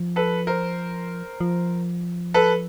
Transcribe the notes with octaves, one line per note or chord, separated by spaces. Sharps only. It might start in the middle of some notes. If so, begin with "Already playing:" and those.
Already playing: F3
A4 B4
A#4 C5
F3
A4 B4